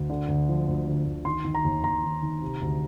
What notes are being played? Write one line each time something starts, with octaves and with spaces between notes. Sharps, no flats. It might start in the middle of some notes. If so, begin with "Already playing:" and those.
Already playing: D2
D3
D2
F3
D2
D3
D2
D#3 C6
D#3
A#5
D#2
D#2 A#5
D#3
D#3
C3
D2